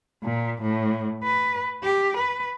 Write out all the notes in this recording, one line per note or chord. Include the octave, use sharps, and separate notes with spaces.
A#2
A2
B4
G4
B4